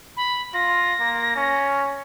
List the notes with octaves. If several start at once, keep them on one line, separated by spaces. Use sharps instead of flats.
B5
F4 A#6
A#3
C#4